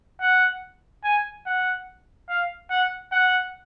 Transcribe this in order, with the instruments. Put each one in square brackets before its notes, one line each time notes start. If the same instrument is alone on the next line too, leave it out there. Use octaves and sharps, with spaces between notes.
[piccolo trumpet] F#5
G#5
F#5
F5
F#5
F#5